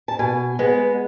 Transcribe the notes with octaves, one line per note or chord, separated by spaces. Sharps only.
A5
B2 G#5
G#3 B3